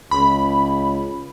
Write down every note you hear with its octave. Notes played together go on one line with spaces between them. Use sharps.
C#2 B5